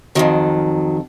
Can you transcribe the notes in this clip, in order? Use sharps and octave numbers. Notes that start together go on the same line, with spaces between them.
F2 C3 D#3 F#3